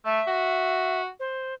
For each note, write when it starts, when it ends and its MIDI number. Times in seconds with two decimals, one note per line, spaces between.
0.06 0.21 57
0.06 1.01 76
0.27 1.07 66
1.20 1.54 72